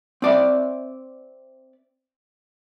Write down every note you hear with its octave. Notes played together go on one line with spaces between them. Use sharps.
C4 D5 E5